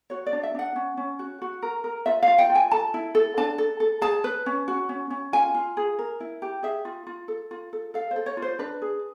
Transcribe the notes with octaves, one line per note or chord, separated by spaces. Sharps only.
F#4 C#5
D5
D4
E5
D4 F#5
C#4
C#4
F#4
F#4
A#4
A#4
F4 E5
F4 F5
G5
F4
G#5
A4 A5
E4
A4
D4 A5
A4
A4
G#4 A5
B4
C#4
F#4
C#4
C#4
F4 G#5
F4
G#4
A#4
E4
G4
G#4 E5
F4
F4
A4
F4
A4
A4 F5
C5
A4
C#5
F4
C5
D4 B4
G#4